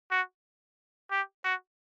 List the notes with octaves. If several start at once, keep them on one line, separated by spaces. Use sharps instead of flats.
F#4
G4
F#4